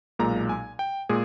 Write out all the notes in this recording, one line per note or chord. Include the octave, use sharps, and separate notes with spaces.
B1 A#2 G#3 A#5
G#5
G5
A#2 G#3 G#4